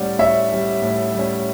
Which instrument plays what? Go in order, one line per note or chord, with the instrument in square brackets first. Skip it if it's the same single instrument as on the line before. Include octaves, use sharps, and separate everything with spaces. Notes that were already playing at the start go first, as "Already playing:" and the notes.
Already playing: [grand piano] A2 G3 C#4 D5 F#5
A2 C#5 E5
G3 C#4
A2
G3 C#4